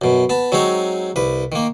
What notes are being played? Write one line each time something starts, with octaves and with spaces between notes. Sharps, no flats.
F#2 B2
B3 A5
F#3 G#3 C4 D#4 C#5
C2 B4
D#3 A#3